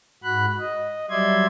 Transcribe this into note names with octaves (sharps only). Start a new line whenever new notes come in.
G#2 F#4 B5 F#6
D#5
F#3 G3 D5 E5 C6 G#6